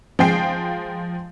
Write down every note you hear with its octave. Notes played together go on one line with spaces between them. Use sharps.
F3 G#3 G5 C7